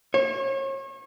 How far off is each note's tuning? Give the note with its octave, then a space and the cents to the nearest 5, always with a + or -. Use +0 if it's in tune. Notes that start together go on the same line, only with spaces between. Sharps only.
C#5 -35